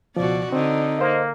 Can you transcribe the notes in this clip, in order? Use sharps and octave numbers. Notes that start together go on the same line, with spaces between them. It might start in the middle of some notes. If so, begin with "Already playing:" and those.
C#2 B2 F3 F#4 D5
D3 C4 D#4
A#3 C5 D#5